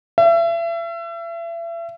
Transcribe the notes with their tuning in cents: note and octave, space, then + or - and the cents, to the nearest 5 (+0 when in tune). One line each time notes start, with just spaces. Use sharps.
E5 +35